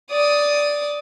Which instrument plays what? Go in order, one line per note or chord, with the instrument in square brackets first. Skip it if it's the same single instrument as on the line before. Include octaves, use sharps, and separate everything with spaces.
[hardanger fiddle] D5 D#6